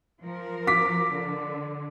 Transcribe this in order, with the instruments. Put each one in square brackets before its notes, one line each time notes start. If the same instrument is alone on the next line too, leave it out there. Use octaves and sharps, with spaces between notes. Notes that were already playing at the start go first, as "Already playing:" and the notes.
[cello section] F3 A#4
[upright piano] D6 B6
[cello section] D3